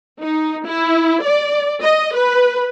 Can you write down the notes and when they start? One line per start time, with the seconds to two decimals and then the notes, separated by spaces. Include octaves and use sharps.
0.21 D#4
0.65 E4
1.22 D5
1.82 D#5
2.15 B4